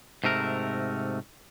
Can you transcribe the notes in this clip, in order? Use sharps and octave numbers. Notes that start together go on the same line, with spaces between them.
G#2 C3 A3 A#4